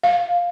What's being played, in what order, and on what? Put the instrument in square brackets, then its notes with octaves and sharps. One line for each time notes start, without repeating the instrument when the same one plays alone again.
[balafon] F5